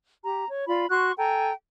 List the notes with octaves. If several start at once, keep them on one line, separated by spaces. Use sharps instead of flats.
G4 A#5
C#5
F4 D5 B5
F#4 C6 C#6 F#6
A4 G5 G#5 A#5